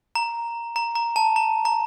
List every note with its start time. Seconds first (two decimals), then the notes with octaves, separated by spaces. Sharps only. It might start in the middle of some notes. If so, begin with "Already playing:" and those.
0.15 A#5
0.76 A#5
0.95 A#5
1.16 A5
1.36 A#5
1.65 A#5